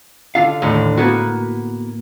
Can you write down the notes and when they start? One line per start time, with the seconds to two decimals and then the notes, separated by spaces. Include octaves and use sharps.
0.35 D3 F4 F5 A5
0.62 D#2 A2 D3
0.97 A#3 B3 F#4